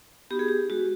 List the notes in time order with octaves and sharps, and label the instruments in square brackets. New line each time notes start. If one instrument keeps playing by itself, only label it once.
[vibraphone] B3 D#4 F#4 G4
G#4
G4
G#3 F#4